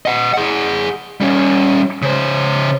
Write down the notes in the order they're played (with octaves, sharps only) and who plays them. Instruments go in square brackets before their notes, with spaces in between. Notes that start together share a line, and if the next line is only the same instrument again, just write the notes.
[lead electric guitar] D#5 F#5
G#4 F#5
G3 C#4
C#3 C5